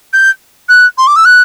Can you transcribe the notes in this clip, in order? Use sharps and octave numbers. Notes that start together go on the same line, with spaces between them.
G6
F#6
C6
D6
E6
F#6